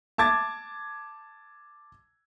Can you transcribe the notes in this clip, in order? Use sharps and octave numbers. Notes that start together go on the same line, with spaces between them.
A5 D6 G#6 A6